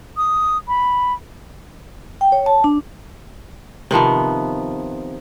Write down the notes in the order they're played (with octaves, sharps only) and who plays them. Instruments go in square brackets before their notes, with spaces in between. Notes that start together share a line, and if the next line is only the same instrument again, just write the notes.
[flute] D#6
B5
[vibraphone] G5
C#5
A5
D4
[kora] C3 D#3 F3 B3